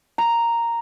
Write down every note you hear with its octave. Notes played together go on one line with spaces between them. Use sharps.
A#5